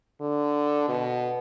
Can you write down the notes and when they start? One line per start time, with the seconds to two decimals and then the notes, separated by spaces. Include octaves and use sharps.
0.21 D3
0.89 B2